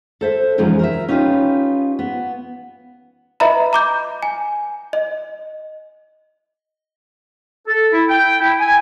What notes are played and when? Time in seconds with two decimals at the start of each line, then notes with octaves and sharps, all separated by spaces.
0.21 A4 C5 E5
0.58 E2 C#3 F3 F#3 G#3 D#4
0.79 A#4 C5 E5
1.09 C#4 D#4 F4 G4 B4
1.99 B3
3.40 B4 D#5 E5 A#5 B5
3.73 A#5 D6 G6
4.23 G#5
4.93 D#5
7.67 A4
7.92 E4
8.09 G5
8.41 E4
8.59 G#5